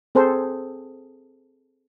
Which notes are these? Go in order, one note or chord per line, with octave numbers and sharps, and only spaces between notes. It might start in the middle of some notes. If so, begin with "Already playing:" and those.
C4 G#4 A4 C5